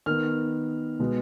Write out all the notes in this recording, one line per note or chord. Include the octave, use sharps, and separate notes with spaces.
D#3 B3 F6
B2 G#3 B3